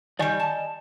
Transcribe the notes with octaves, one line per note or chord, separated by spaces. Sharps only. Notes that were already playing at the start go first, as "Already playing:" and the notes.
D#3 G3 D5 D#5 G#5
A5